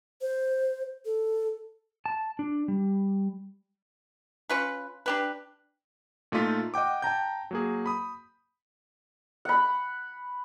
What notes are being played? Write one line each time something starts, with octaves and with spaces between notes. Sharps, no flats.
C5
A4
A5
D4
G3
C#4 F4 B4
D4 G4 B4
A#2 A3 D#4 F4 B6
D#5 F#5 G5 D6
G5 A5 A#5 G6
F#3 A#3 G#4
B5 D#6
F#5 B5